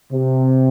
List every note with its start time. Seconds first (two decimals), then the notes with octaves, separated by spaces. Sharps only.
0.12 C3